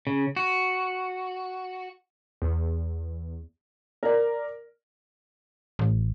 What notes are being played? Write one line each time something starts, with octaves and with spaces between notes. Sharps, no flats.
C#3
F#4
E2
A#4 D5
A1